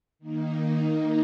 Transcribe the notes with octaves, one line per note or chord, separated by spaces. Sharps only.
D#3 A#3 D#4